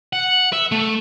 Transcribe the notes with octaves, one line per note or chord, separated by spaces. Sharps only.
F#5
E5
A3